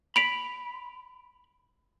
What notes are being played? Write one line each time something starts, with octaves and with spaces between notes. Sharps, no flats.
B5 B6 D7 F7